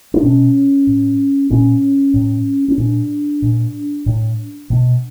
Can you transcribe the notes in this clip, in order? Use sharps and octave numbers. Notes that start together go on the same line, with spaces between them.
D4
B2 C#4
A2
A#2 C#4
A2
C#4
A#2 D4
A#2
A2
B2